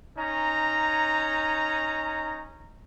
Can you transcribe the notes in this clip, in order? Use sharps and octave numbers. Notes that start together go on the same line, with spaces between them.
C#4 D#4 A#5